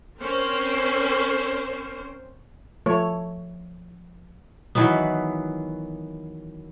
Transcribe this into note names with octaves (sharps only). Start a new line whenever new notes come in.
C4 C#4 A#4 C5
F3 A3 C#5
D#3 E3 F#3 B3